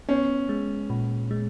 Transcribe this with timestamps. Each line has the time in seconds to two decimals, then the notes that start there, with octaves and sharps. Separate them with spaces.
0.09 B3 C#4
0.49 G#3
0.90 A#2
1.31 G#3